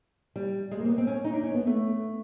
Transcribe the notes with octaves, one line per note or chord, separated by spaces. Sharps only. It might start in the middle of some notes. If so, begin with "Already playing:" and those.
G3
G#3
A#3
C4
B3
C4
C#4
D#4
D4
C#4
B3
A3